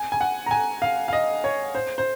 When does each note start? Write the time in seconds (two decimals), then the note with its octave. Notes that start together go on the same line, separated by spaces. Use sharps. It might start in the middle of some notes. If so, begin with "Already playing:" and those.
Already playing: G#5
0.12 G#5
0.21 F#5
0.46 A#5
0.51 G#5
0.82 F5
1.08 F5
1.13 D#5
1.44 C#5
1.75 C5
1.98 C5